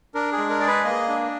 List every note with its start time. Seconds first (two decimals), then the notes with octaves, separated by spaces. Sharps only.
0.14 D4 A#4
0.32 G#4
0.38 G#3
0.50 A#4
0.60 G#4 D5
0.67 B4
0.84 A#3 D#5
1.08 D4